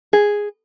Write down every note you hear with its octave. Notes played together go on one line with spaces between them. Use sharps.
G#4